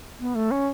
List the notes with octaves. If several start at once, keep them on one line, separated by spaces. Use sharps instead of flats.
B3
A3
C#4